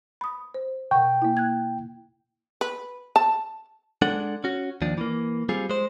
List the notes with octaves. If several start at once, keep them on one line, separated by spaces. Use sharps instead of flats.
B5 D#6
C5
B2 F#5 G5 C#6
A#3 E4
F#6 G#6
B4
A5
G#3 D4 A4 F#5
C#4 F#4
D#2 F3 D4
E3 A#3
G3 C4 F4 G#4
G#3 C5